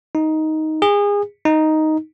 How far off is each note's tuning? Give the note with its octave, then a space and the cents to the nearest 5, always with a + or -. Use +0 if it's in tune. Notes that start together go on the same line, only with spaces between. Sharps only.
D#4 +10
G#4 -30
D#4 +5